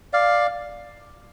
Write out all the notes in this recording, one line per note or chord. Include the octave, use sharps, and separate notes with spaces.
D5 F5